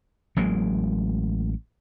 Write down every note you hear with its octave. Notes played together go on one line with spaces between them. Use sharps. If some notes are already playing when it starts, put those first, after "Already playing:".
A1 F#3 G#3 A#3